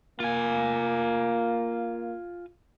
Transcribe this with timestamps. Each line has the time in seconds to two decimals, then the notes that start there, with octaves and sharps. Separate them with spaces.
0.20 A#3 F4 G#5